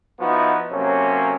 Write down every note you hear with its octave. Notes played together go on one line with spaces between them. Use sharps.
F3 B3 D#4 E4 F#4
C3 F#3 A#3 C#4 A4 C5